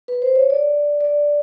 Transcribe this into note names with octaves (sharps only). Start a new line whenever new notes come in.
B4
C5
C#5
D5
D5